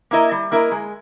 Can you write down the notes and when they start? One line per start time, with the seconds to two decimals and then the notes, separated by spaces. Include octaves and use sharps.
0.11 A#3 E4 A#4 D#5
0.32 G3
0.52 A#3 E4 A#4 D#5
0.72 G#3